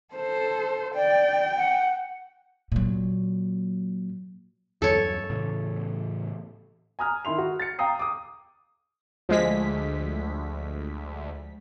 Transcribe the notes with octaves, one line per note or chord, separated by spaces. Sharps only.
A4 C5
D5 G5
F#5
A#2 F#3
E2 G2 F#3 A4 C#5
A2 C#3 E3
G#5 A#5 D#6 F6
D#3 E4 C6 F7
F#4
A6 C#7
F5 G5 A#5 D#6 C7
D6 D#6
D2 F3 G#3 B6